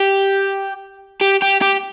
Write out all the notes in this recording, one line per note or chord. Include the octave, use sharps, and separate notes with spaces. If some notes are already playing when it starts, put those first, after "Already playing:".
Already playing: G4
G4
G4
G4